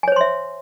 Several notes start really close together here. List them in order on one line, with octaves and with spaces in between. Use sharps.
G#5 C#5 C5 C6 E5